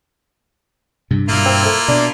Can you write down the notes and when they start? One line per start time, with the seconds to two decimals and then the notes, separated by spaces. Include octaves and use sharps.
1.11 G2 C3
1.29 G2 B2 G3 A#3 E4 F4
1.46 C4
1.65 A3
1.88 B2 D4